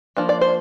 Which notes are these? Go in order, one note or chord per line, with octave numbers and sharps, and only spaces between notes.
F3 A#3 D4
D5
C5